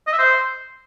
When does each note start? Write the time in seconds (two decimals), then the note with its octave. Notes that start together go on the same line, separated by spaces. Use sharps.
0.07 D#5
0.13 E5
0.18 C5